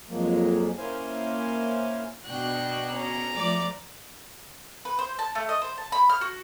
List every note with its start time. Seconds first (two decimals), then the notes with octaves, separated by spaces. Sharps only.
0.09 F2 F3 F#3 G#3 A#3
0.78 A#3 C#4 E4 C5 F5 G#5
2.25 B2 D4 F#4 G5 F#6
2.93 C#4 A#5
3.35 F3 A3 D5 D6
4.85 B4
4.99 C5
5.19 A5
5.35 A3
5.49 D#5
5.62 C5
5.78 A5
5.92 B5
6.10 F6
6.21 F#4